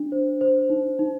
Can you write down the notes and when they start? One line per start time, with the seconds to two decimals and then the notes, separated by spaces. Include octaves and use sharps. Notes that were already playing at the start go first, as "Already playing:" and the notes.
Already playing: D4
0.12 C5
0.41 C5
0.70 D#4
0.99 D#4